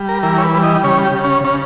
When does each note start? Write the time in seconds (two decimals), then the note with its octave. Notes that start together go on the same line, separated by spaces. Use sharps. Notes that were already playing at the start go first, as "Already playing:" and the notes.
Already playing: G3
0.09 A#4
0.23 E3 A#4
0.38 C#5
0.44 B4
0.54 G3
0.63 D#5
0.84 C#3 C#5
1.05 G4
1.15 C#3
1.24 C#4
1.44 C#3 C#4